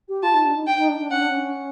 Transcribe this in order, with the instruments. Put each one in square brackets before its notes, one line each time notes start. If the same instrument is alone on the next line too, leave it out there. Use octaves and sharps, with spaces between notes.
[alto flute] G4
[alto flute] F4 [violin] A5
[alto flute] D#4
D4
D#4
[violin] G5
[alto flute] D#4
D4
D4
[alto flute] C#4 [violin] F#5
[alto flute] D4
C#4